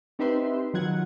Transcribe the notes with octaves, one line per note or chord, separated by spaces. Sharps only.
C4 D#4 G4 B4 E5 C6
D#3 F#3 F4 F#5 G#6